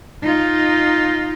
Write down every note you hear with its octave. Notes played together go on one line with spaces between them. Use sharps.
D#4 F4